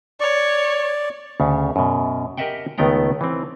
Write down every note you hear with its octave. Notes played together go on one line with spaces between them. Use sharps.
C#5 D5
D2 C#3
F#2 B2
G4 A#4 D#5 E5 F#5 G5
C#2 D#3 A3 B3 G5 A#5
E3 C4